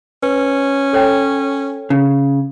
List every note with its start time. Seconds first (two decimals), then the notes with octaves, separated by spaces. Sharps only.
0.23 C#4 B4
0.93 A4 C#5 G5
1.90 C#3